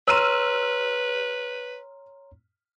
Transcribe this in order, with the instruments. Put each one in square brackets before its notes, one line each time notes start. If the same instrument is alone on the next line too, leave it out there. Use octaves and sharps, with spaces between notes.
[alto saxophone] B4 [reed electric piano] C#5 A#5 C6 [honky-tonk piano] E6 F6 D#7